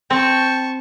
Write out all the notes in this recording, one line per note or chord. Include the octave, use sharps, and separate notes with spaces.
C4 G5 A5 C#6